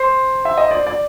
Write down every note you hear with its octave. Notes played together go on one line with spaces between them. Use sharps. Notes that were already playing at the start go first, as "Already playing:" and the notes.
Already playing: C5
E5
D#5
D5
D5